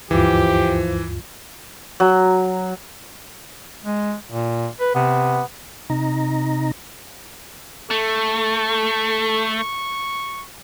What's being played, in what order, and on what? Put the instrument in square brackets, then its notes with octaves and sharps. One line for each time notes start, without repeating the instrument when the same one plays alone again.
[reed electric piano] D2 G2 F4 [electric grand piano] E3 [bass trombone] F3 [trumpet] G4
[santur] F#3
[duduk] G#3
A#2
B4
[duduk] C3 [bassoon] B3
[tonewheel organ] C3 D#4 A#5
[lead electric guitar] A3 [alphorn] A4 [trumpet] C#6